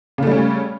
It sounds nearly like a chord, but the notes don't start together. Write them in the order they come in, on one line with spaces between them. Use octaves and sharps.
C#3 A3 G3 C#4